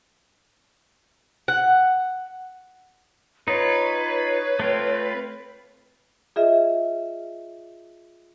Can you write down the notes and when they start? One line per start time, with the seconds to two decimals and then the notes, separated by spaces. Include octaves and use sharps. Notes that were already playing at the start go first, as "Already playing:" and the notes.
1.48 F#5
3.48 D#4 F4 B4 C#5
4.60 A3 C4 F4
6.36 F4 G#4 D#5 E5